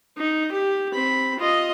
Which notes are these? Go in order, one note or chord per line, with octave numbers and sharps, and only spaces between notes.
D#4
G4
C4 B5
F4 D#5